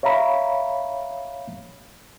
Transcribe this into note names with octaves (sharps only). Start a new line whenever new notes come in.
C#5 E5 F5 A#5 B5